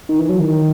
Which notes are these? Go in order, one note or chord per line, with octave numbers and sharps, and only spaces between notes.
D#3
E3
F#3
D#3